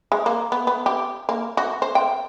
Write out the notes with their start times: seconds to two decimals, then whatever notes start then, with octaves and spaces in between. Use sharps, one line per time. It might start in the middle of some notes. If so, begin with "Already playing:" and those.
0.12 G#3
0.26 A#3
0.52 B3
0.67 B3
0.86 G4
1.29 A#3
1.57 F#4
1.82 C5
1.95 G5